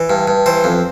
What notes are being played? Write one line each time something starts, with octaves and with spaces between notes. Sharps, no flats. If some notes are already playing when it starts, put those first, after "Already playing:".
Already playing: E3
G2
G2
E3 C5
F2